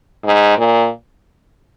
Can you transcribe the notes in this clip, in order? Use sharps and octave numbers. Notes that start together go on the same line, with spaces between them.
G#2
A#2